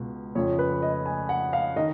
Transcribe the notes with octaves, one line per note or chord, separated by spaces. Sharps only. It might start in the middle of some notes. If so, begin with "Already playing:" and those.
Already playing: C#2 B2
F2 C#3 C#5
B4
D#5
G#5
F#5
F5
D#3 D#5